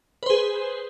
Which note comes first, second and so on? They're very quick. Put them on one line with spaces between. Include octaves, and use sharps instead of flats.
B4 C5 G#4